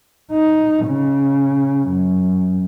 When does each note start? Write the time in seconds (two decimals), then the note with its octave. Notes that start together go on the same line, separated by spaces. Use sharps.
0.32 D#4
0.86 C#3
1.88 F#2